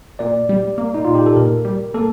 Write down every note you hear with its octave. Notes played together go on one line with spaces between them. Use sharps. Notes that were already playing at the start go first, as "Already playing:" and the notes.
A#2 D5
G3
A#3
D#4
A#2 F4
G4
A4
A#2 A#4
G3
A#3 A4